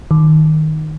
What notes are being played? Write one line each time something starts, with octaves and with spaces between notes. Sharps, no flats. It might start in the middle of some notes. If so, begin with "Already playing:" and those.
D#3